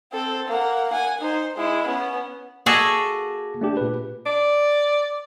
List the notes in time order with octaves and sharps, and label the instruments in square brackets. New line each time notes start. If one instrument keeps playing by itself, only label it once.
[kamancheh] C4 A4
A#3 F#5
F#5 G#5
D#4 C5
G#3 E4
B3 C#4
[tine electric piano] A#3 D6 A#6 [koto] F#4 G#4 A4
[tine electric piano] A3 D4 G4
A#2 B4
[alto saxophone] D5